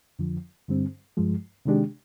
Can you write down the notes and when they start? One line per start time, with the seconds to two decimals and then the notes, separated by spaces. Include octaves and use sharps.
0.19 F2 D3 F3
0.68 G2 D3 G3 C4
1.17 G2 F3 G#3
1.65 C3 D#3 G#3 D4 G4